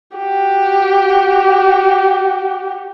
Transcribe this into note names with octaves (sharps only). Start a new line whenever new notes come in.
F#4 G4